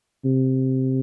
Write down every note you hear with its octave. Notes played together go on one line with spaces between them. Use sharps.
C3